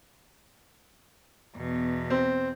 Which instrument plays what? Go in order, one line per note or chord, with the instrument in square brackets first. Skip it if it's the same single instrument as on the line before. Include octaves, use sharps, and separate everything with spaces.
[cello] E2 B2
[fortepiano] C4